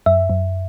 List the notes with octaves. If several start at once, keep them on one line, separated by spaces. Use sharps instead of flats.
F#2 E5
F#2